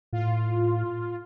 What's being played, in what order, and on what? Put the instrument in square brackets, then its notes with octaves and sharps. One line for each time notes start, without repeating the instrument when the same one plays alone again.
[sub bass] A2 [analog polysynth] F4